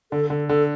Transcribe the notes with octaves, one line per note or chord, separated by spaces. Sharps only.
D3 A4
D3 A4
D3 A4